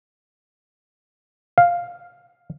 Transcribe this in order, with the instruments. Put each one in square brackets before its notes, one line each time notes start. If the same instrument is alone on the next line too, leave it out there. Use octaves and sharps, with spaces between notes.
[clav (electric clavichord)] F5